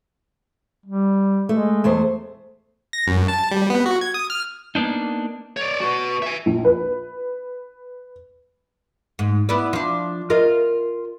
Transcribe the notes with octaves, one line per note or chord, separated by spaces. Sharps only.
G3
G#3 A3
E2 A3 C5
A#6
F#2
A5
G3
B3
F#4
G#6
D#6
F6
A#3 B3 D4 D#4
C#5 D5
F#4 B4
E5 G#5
A#1
B4
G#2
B3 E4 D5
F3 D4
F4 A#4 D#5